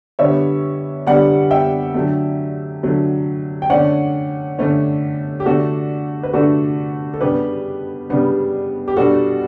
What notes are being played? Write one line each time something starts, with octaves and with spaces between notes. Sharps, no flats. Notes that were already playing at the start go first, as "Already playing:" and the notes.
D3 G3 B3 C#5 E5
D3 G3 B3 D5 F#5
E5 G5
D3 F#3 A3
D3 F#3 A3
G5
D3 A3 C#4 D5 F#5
D3 A3 C#4
G4
D3 A3 D4 F#4 A4
B4
D3 A3 D4 F#4 A4
A4
C#3 G3 B3 D4 G4 B4
C#3 G3 B3 D4
G4
B2 G3 D4 F#4 A4